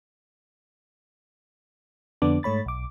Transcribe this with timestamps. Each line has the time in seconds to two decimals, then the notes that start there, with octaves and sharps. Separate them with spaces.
2.22 F2 D3 B3 D4 D6
2.43 G#2 A3 C#5 B5 A6
2.66 B1 D6